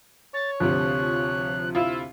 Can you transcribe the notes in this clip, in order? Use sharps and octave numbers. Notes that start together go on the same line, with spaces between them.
C#5 A6
D2 C3 F3 F#6
E4 F4 E6